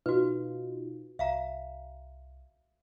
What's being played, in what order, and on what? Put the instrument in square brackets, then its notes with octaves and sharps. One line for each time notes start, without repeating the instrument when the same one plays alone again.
[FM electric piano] B2 D#4 F4 [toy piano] F#4 B4
[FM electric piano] C2 [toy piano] E5 F5 A#5